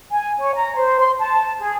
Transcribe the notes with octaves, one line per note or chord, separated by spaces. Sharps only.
G#5
C#5
A#5
C5
C6
A5
G#4